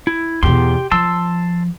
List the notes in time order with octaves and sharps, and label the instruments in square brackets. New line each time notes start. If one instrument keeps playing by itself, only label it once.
[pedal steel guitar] E4
[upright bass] E2 B2 [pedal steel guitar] G4 C6
[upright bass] F3 [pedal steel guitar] A5 C6 E6